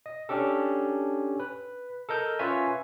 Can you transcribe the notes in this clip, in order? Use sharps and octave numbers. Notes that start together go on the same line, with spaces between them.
D#5
C#4 D4 G4 A4
B4
A4 A#4 D#5 G6
C#4 F4 B4 C#5 E5 G#5